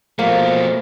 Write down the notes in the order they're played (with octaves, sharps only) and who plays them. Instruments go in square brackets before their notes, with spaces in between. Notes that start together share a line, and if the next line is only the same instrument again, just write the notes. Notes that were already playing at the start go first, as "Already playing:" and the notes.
[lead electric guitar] B2 A3 [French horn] F3 [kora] A#3